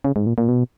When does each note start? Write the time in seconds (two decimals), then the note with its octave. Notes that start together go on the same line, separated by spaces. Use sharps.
0.05 C#3
0.16 G#2
0.26 A#2
0.38 A#2
0.48 B2